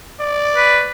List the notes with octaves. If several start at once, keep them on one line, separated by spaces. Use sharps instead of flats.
D5
B4